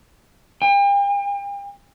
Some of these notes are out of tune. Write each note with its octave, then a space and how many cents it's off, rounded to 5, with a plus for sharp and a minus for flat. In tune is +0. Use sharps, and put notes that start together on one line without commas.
G5 +40